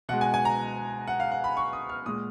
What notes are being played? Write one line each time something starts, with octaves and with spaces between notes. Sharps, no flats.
B2 G#3 F#5
G#5
G#5
A#5
F#5
F5
F#5
B5
C#6
D#6
F6
A#2 G#3 D#6